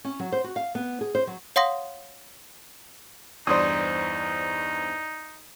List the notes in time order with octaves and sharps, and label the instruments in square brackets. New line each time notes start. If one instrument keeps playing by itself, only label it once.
[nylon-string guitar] C#4
F#3
C5
F#4
F5
B3
G#4
C5
F#3
[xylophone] C#5 F5 F#5 C6 D#6 A#6
[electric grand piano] E2 G2 C5 [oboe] D#4 [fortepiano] D5 C6 D#6